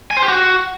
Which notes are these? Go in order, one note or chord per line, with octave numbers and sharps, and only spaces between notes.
G#5
C5
G4
F#4